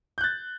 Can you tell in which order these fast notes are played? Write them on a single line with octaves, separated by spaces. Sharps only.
G6 F#6 A6